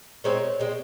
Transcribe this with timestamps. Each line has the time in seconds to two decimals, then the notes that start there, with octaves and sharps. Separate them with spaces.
0.24 A#2 G#3 C4 C#5
0.60 A#2 G#3 C4